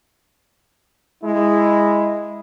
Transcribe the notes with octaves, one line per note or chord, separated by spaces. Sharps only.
G#3 E4